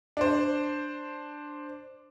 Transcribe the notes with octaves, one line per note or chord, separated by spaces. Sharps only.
D4 C5